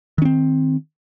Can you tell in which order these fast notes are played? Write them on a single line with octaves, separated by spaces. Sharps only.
D#3 C#4 C4